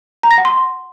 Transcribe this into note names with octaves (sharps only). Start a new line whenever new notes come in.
A#5
A#6
F#5
C6